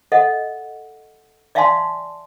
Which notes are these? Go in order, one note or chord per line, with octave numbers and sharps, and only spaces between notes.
A4 D#5 E5 F#5
D5 E5 F5 G#5 A5 C6